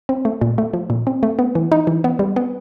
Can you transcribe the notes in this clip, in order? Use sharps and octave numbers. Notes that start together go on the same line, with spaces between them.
C4
A3
A#2
A3
F3
A#2
C4
A3
B3
E3
D#4
E3
B3
G3
B3